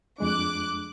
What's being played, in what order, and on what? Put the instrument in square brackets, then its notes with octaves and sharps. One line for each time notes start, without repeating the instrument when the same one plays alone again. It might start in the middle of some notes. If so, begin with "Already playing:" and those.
[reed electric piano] F2 G#3 D4 [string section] D6 F#6